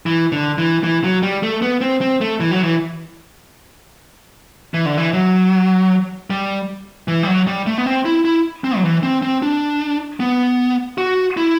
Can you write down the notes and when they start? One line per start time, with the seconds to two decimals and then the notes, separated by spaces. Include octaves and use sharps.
0.06 E3
0.32 D3
0.58 E3
0.84 E3
1.04 F#3
1.23 G3
1.43 A3
1.62 B3
1.81 C4
2.01 C4
2.21 A3
2.40 E3
2.51 F#3
2.63 E3
4.74 E3
4.86 D3
4.97 E3
5.13 F#3
6.30 G3
7.08 E3
7.23 G3
7.28 F#3
7.47 G3
7.67 A3
7.78 B3
7.86 C4
8.05 E4
8.25 E4
8.64 C4
8.77 F#3
8.83 E3
9.03 C4
9.22 C4
9.42 D4
10.20 B3
10.98 F#4
11.37 E4